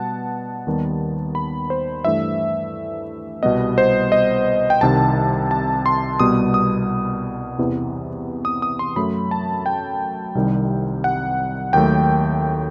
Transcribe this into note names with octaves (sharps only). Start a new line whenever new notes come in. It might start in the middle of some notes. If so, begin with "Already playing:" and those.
Already playing: B2 G3 B3 F#5 A5
D#2 D#3 G3 B3
B5
C5
G2 E3 A3 E5
C2 B2 G3 B3 D#5
C5
D#5
G5
C2 C3 D#3 A5
A5
C6
C2 B2 G3 B3 D#6
D#6
E2 C3 E3 B3
D#6
D#6
C6
F#2 F#3 A3 B5
A5
G5
C2 C3 D#3 G3
F#5
D#2 D#3 F#3 A3 G5